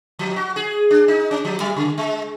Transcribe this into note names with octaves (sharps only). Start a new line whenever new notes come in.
F3
F#4
G#4
D4
D#4
C#4
F3
F#3
C#3
G#3